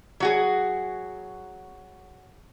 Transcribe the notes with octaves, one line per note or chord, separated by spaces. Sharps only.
F#3 F#4 G#4